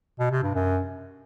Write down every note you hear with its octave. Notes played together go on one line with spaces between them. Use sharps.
B2
C3
G2
F#2